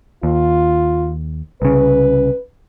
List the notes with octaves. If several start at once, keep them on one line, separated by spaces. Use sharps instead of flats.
D#2 F4
C2 C#3 B4